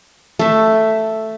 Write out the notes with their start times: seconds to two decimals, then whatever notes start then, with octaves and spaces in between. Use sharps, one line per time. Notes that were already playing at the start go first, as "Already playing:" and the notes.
0.39 A3 E5